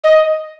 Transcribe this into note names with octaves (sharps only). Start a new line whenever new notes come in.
D#5